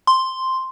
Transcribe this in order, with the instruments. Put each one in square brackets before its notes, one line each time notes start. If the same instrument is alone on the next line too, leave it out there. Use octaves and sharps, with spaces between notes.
[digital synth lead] C6